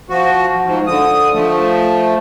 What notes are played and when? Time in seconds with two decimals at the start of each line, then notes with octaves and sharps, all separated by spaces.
0.10 F3 F#4
0.65 G#2 F3
0.87 D3 D#6
1.34 F3 A3